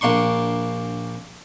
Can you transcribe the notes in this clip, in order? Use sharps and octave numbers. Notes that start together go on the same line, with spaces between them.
A#1 A#3 D4 C6 C#6